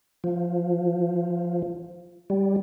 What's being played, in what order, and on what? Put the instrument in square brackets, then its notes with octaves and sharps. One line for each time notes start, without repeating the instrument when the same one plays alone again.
[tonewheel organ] F3
G3